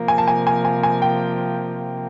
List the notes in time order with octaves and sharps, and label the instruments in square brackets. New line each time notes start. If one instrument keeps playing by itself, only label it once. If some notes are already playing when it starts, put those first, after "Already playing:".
Already playing: [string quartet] C3 F3 A#3
[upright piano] G#5
A5
G#5
G#5
G#5
G#5
G5